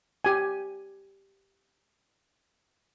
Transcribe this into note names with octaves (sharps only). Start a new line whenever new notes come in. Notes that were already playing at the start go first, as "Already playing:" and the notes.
G4 G#5